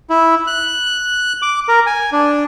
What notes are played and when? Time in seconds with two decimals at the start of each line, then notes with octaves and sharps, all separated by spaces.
0.10 E4
0.47 F#6
1.42 D6
1.68 A#4
1.86 G#5
2.12 D4